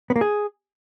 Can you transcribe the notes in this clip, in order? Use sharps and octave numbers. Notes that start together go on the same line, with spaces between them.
B3
A#3
G#4